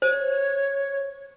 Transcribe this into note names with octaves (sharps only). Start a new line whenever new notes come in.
C5 C#5